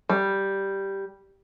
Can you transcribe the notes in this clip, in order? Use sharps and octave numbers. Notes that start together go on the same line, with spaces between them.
G3